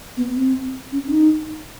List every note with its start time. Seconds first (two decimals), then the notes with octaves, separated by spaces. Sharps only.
0.17 B3
0.36 C4
0.92 C#4
1.07 D4
1.11 D#4